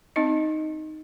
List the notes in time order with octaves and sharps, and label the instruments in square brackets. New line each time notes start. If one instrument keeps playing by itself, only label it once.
[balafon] C4 D#4 D#5